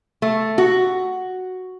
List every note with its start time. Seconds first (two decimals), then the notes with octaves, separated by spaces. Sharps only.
0.22 A3
0.58 F#4